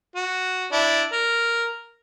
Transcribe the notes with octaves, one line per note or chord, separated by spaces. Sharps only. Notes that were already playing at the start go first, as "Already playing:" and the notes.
F#4
D4 E4
A#4